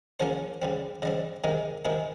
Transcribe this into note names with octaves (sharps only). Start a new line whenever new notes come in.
C#3 F3 A#3 C#4 C5
C#3 G3 C4
C#3 G3 C4 D#5
C3 D#3 G#3
C3 D#3 G#3 G#4